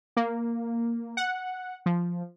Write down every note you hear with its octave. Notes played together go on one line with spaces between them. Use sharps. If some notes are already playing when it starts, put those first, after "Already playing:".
A#3
F#5
F3